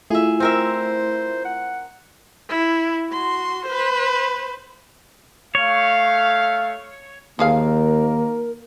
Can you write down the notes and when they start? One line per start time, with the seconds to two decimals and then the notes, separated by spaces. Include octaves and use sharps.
0.10 A3 E4 F4 G#4 E5
0.40 C4 A#4 C5 E5
1.45 F#5
2.49 E4
3.12 F#4 C6
3.66 B4 C5
5.55 A3 C#5 F5
7.39 D#2 F3 A#3 G#4 A#4 F5